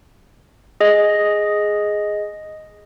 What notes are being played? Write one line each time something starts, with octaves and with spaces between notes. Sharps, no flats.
G#4 D#5